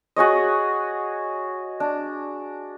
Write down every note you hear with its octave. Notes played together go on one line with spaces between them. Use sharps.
F#4 G#4 C#5 D#5
D4